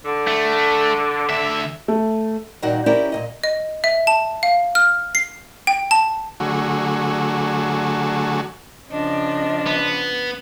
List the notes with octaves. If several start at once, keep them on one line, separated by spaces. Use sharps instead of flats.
D3
A3
D2 E5
A3
D#2 A#2 D#3 G3 F#4 F#5
C#4 E4 G4 A#4 C5 D5
A#2 D#3 D#5
D#5
E5
A5
F5
F6
C7
G5
A5
D3 F#3 A3 F#4 G#4
C#3 F3 D4 D#5
B3